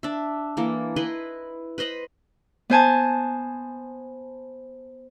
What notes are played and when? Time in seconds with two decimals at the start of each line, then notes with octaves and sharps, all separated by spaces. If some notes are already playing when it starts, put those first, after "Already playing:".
0.03 D4 E5
0.57 E3 A#3 A4
0.96 E4 B4 D#5 C6
1.78 B4 C5 D#5 B5
2.70 B3 C5 G#5 A5